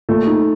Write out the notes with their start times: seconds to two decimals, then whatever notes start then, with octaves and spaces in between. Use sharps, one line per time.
0.09 A#2 A3
0.27 D#4